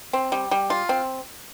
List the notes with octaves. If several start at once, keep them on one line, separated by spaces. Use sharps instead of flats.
C4
G3
G3
F4
C4